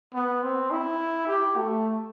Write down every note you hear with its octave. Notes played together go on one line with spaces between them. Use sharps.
B3
C4
E4
G4
A3